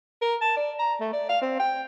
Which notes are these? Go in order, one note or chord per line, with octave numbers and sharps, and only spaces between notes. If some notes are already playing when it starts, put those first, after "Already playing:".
A#4
A5
D5
A#5
A3
D5
F5
C4
G5